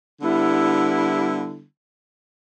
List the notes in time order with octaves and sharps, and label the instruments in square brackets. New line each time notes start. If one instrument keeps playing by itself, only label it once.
[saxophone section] D3 G3 B3 E4